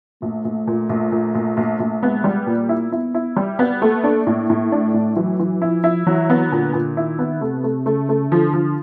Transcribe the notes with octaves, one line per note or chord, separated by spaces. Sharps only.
A#1 A3
A#1
A#2
A#1
A#2
A#1
A#1
A#1
G#3 B3
G3
A#2 A#3
E4
B3 E4
E4
G3
B3
A3 A#3
D4
A2
A2
A3 D4
A2
E3 F#3
E3
F3 E4
E4
E3 F#3
B3
A#2 D3
A#2
D#3 E4
B3
C3 A3
A3
C#3 A3
A3
D3 F3
F3